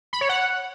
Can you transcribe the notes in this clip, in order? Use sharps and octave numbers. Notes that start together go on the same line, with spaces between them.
B5
C#5
F#5